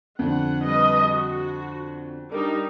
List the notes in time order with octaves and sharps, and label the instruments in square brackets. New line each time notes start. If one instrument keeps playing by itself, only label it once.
[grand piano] F2 D3 [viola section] F#5
[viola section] G3 B4 D#5
F#4
[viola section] G3 D4 D#4 [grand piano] A#4